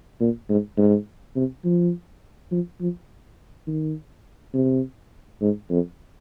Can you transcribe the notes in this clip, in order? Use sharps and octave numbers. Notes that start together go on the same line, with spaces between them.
A#2
G#2
G#2
C3
F3
F3
F3
D#3
C3
G#2
F2